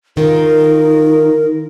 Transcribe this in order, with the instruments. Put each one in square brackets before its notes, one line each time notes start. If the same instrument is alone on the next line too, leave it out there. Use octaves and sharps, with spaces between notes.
[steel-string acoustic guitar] D#3 F4 [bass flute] D#4 [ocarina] A#4